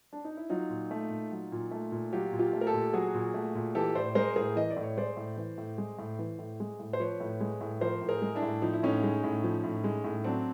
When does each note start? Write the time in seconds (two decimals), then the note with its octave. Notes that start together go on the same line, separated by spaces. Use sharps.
0.13 D4
0.25 D#4
0.37 E4
0.50 F#3 D#4 F4
0.70 A#2
0.91 A3
1.11 A#2
1.31 F#3
1.52 A#2
1.71 A3
1.92 A#2
2.13 F#3 F4 G4
2.33 A#2
2.39 F4 G4
2.53 A3
2.61 A#4
2.67 G4 A4
2.74 A#2
2.93 F#3 F#4 G#4
3.14 A#2
3.34 A3
3.55 A#2
3.75 E3 G4 A4
3.95 A2 C5 D5
4.15 G#3 A#4 C5
4.36 A2 G#4 A#4
4.56 E3 D#5
4.70 D5
4.77 A2
4.83 C#5
4.97 G#3 C5 D5
5.17 A2
5.37 E3
5.58 A2
5.78 G#3
5.99 A2
6.19 E3
6.39 A2
6.60 G#3
6.80 A2
6.93 C5
7.00 F3 B4 C#5
7.20 A2
7.40 G#3
7.61 A2
7.81 F3 A#4 C5
8.01 A2
8.09 G#4 A#4
8.22 G#3
8.35 D4 E4
8.42 A2
8.62 F3 D#4
8.73 E4
8.83 A2 C#4 D#4
9.03 G#3
9.24 A2
9.44 F3
9.64 A2
9.84 G#3
10.04 A2
10.24 F#3 C4 D4